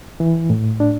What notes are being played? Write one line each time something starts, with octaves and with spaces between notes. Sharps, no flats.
E3
A2
D4